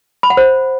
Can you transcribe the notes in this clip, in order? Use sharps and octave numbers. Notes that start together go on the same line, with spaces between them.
B5
F#5
C5